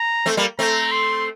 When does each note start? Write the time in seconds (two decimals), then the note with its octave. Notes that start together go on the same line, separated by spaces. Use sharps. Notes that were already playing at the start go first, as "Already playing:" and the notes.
Already playing: A#5
0.26 A3 C4
0.37 G3 A#3
0.59 A3 C4 A#5
0.92 C6